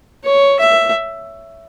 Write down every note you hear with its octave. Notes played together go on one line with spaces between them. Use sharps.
C#5
E5